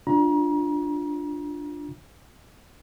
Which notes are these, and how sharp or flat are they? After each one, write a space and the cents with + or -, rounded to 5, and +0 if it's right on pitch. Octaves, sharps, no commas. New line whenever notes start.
D4 +0 F4 +0 A#5 +35